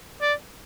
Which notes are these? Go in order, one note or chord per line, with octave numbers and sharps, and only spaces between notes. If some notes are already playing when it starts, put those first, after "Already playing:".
D5